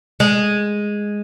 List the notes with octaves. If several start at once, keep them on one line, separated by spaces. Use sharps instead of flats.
G#3